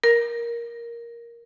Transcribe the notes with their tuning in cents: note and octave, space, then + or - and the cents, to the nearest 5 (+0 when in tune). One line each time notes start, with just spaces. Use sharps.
A#4 +5